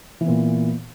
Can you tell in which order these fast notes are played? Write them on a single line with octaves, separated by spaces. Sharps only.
E3 B3 A#2